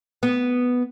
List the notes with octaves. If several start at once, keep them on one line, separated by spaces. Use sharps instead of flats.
B3